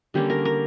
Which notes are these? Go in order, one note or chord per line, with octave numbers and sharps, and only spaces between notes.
D3 G3 A#3 C#4 G4
A#4
A#4